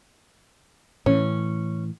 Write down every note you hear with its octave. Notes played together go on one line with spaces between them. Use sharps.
A2 E3 C#4